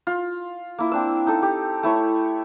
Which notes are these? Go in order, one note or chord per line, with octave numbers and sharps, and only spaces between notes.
F4
A#3 E4
C4 D4 E6
D#4 A4
G4
A3 E4 C#5